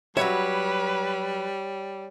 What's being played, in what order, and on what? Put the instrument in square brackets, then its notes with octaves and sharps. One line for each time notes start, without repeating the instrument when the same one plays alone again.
[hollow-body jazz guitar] F#3 E5 [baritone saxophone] G3 [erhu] B4 [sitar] C#5